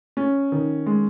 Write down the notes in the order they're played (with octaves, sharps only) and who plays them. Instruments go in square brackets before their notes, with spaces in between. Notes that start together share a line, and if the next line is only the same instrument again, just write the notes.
[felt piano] C#4
D#3
G#3